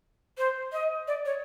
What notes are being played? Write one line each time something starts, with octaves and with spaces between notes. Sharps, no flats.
C5
D#5
D5
C#5